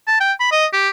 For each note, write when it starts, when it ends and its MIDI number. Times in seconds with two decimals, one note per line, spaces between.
0.07 0.19 81
0.20 0.32 79
0.40 0.49 83
0.51 0.66 75
0.73 0.89 67